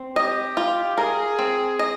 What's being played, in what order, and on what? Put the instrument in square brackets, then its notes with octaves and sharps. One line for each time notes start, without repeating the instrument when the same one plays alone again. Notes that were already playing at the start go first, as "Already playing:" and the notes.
Already playing: [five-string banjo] C4
[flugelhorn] G4 [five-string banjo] D#5
[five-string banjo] F4
[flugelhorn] G#4 [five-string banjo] A#4
[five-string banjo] C4
D#5